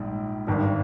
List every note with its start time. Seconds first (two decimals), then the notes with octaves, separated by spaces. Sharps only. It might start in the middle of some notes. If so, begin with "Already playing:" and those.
Already playing: A#1 G#2 G3
0.47 G#1 G2 D#3 G3